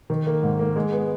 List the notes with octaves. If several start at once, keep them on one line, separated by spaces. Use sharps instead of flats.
D#3
A#3
G#2
A#3
G#3
B3